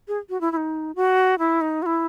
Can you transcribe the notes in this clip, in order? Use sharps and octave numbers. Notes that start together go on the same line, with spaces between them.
G#4
F#4
E4
E4
D#4
F#4
E4
D#4
F#4
E4